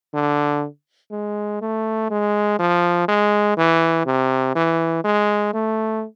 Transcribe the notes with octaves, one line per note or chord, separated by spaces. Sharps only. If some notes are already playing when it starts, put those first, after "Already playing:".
D3
G#3
A3
G#3
F3
G#3
E3
C3
E3
G#3
A3